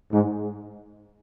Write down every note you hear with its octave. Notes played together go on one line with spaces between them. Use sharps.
G#2